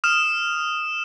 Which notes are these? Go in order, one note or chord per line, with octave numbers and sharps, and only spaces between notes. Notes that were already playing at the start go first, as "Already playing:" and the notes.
D#6 F6 E7